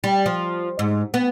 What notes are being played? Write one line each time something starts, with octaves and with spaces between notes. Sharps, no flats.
G3
F3
G#2
B3